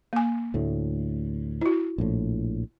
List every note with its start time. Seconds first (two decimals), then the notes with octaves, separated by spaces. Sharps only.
0.13 A#3 G#5
0.54 D2 A2
1.61 E4 F#4
1.98 A#1 A2